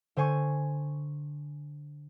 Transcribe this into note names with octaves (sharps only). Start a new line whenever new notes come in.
D3 C5 G#5 C#6